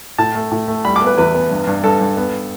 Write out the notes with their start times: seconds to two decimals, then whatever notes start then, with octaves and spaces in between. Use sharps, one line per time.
0.18 A2 A5
0.35 A3
0.51 A2
0.68 A3
0.85 G3 B5
0.96 D6
1.01 B3
1.07 B4
1.18 E2 B4
1.34 B3
1.51 G2
1.67 G2
1.84 G2 A4
2.01 G2
2.17 B3